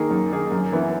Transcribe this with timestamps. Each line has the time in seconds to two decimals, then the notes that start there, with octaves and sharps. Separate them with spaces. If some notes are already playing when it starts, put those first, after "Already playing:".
Already playing: D#3 A#3 D#4 G#4
0.11 F#2
0.32 D#3 A#3 D#4 G#4
0.52 F#2
0.72 E3 B3 E4